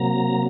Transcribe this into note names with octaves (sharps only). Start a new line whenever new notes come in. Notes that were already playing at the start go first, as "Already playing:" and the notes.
Already playing: C3 F#3 A#3 A#5